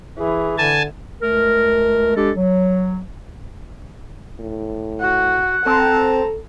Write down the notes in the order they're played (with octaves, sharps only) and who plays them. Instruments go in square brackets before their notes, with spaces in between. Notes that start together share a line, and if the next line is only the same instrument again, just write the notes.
[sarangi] E3 [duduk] G#4
[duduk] D3 [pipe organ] G#5 A5
[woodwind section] C#2 A3 A#4
G#3 D4 G4 A4
F#3
[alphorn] A2
[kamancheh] F#4 [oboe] F#5
[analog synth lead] C4 [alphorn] A4 [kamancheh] A5 A#5